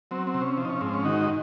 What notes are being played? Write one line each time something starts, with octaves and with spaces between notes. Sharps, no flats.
F#3 C4
C4
C3
C#4
F3
D#4
C#4
G#2 C4
C#4
D#3 D#4 F#4